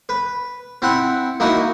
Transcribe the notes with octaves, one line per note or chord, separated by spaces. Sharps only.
B4
C4 E4 F#5
A#3 D#4 E4 F#4